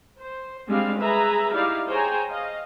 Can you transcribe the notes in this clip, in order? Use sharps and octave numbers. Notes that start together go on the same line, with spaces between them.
C5
G3 G#3 C4 D4 F5
G#4 B4 E5 A#5
D#4 E4 G4 D5 F5
G#4 C5 C#5 G5 G#5 A#5
D#5 F5